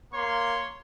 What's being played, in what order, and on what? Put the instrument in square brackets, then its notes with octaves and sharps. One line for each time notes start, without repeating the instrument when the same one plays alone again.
[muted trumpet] A#3 [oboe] C#5 [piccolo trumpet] C6